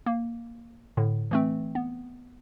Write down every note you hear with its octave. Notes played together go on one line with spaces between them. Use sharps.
A#3
A2 D3
E3 A3 C4
B3